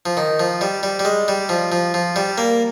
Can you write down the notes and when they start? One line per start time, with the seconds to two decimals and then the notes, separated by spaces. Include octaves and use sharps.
0.06 F3
0.17 D#3
0.39 F3
0.61 G3
0.83 G3
0.99 G3
1.05 G#3
1.28 G3
1.49 F3
1.72 F3
1.94 F3
2.16 G3
2.38 A#3